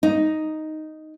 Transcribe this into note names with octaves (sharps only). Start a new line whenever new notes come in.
D#4